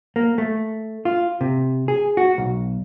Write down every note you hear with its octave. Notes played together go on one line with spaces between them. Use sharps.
A#3
A3
F4
C3
G#4
F#4
B1